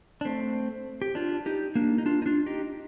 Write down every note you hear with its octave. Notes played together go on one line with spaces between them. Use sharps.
D4
A3 C4
G4
D4 F4
D#4 G4
A#3 D4
D#4
D4 F4
D#4
D4 F4
D#4 G4